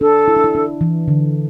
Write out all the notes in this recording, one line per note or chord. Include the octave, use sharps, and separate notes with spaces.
D4 A4
E4
D4
E4
D4
E3
D3